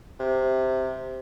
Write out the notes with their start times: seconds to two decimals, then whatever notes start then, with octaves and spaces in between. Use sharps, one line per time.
0.20 C3